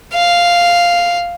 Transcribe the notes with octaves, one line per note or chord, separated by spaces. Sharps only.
F5